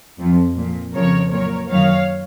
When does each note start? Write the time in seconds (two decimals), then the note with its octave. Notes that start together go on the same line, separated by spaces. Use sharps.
0.19 F2 F3
0.57 A#2 F3
0.94 F2 C#3 F3 A#4 C#5
1.31 A#2 F#3 A#4 C#5
1.69 F#2 D#3 F#3 C#5 F5